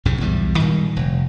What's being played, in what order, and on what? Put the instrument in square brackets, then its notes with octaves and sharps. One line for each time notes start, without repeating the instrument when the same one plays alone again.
[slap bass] C2 F#2 A2 C#3
B1 E2 G#2 G3
A#2 D#3 G3 G#3
F1